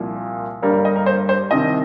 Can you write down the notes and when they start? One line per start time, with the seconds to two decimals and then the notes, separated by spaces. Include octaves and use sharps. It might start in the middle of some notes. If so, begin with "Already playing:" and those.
Already playing: C2 A#2 F3
0.62 G1 G2 G3 A#3 A#4
0.73 A#4
0.85 D#5
0.96 A#4
1.06 C5
1.29 C5
1.51 C2 C3 D#3 D#5